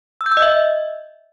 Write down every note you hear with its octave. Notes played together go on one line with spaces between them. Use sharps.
E6
G6
E6
D#5
E5